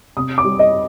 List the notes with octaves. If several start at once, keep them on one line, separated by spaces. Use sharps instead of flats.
C3 D#6
D6
G3
D#5